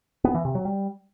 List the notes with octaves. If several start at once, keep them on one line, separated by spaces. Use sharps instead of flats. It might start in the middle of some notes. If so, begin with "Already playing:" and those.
B3
E3
C3
F#3
G3